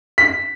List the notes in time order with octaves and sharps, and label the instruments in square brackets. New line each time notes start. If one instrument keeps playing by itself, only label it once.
[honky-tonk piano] B6